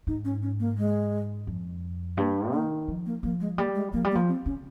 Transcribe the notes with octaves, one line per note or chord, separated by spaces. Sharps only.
G#2 D#4
C#4
C#4
A#3
G#3
F2
G2 A#3
D#3 A#3
F3
A#3
F3 A#3
G#3
G3 A#3
G#3
F3 A#3
G3
A#3
F3
C4
C#3 C#4